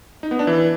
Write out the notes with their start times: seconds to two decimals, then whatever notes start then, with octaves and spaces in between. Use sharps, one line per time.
0.23 D#4
0.31 B3
0.39 D4
0.47 E3